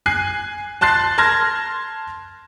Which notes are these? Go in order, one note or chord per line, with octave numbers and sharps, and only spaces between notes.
G#5 F#6 C7
A5 C6 F#6 A6 C7
A5 C6 F6 G#6 A#6